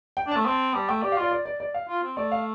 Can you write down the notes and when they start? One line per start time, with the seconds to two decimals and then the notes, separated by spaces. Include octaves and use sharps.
0.17 G5
0.27 D4 A5
0.36 A3
0.46 C4 A5
0.74 G3 A5
0.89 A3 G5
1.02 G4 D5
1.12 F5
1.17 F4 D5
1.31 D5
1.45 D5
1.60 D5
1.74 F5
1.89 F4
2.03 C4
2.17 A3 D5
2.32 F5